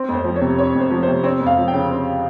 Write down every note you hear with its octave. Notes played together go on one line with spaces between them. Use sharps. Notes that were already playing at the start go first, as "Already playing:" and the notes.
Already playing: C4
F2 C5
F3
C#5
C3
C4 C#5
F2
C5
F3
C5
C3
C4 C#5
F2
F5
F3
G5
C#3
C4